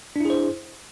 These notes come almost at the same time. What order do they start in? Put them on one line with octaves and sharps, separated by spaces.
D4 E4 G#4 C5